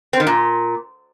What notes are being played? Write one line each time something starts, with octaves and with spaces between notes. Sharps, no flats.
C4
D#3
A#2